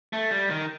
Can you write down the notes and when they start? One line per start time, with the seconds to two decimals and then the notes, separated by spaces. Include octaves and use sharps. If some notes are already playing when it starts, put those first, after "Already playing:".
0.13 A3
0.31 G3
0.50 D#3